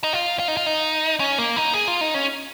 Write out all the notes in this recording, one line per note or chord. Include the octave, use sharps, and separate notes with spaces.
D#4
F4
F4
D#4
F4
D#4
C#4
A#3
D#4
G#4
F4
D#4
C#4